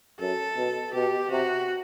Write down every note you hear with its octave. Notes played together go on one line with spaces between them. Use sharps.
F#2 A4
B2
B2 G4
C3 F#4